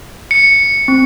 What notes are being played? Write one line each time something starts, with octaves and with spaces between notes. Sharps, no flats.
C#7
C4